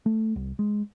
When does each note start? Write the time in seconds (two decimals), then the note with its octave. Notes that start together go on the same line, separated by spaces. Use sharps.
0.06 A3
0.36 C2
0.59 G#3